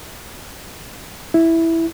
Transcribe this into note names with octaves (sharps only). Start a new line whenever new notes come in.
E4